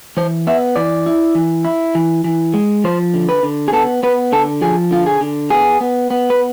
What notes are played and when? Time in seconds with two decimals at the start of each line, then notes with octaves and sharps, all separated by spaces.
0.17 E3 C5
0.47 B3 E5
0.76 E3 D5
1.06 E4
1.35 E3
1.65 E4
1.95 E3
2.24 E3
2.54 G#3
2.84 F3 C5
3.14 D3
3.29 B4
3.43 D3
3.68 G#4
3.73 B3 A4
4.03 B3 B4
4.32 D3 A4
4.61 F3 G#4
4.91 D3 F4
5.06 G#4
5.21 D3
5.50 B3 G#4
5.81 B3
6.10 B3
6.30 B4